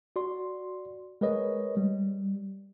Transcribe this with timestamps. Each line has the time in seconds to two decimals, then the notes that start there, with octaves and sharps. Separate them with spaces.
0.16 F#4 D5 C6
1.21 G#3 A#4 B4 C#5 D#5
1.77 G3